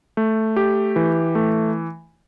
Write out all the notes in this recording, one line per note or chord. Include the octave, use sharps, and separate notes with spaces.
A3
G4
E3
A3